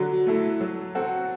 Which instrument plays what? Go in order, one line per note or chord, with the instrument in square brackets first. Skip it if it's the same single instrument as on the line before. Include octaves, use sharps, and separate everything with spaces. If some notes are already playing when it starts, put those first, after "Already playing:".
Already playing: [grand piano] D3 [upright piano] F#3
[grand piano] A3 E4 A4
F#3
C4 F#4 A4